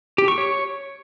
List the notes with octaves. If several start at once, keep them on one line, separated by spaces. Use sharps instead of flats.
G4
C#6
C#5